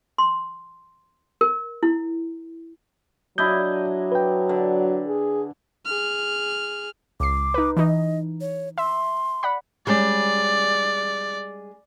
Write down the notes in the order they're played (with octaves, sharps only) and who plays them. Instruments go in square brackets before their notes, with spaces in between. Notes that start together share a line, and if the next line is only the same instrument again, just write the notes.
[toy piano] C6
A#4
E4
[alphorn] F#3 [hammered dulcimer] D4 E4 D#5 [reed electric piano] G6
[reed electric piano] B4 G5
[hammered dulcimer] D3
[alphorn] G#4
[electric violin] G#4 F6
[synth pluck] C#2 C7 [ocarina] D6
[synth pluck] D#4 B4
[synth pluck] E3 D#4 [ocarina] D#5
[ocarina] C#5
[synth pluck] E5 [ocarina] C6
[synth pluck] D5 F#5 B5
[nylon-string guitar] G3 G#3 C#4 [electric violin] D5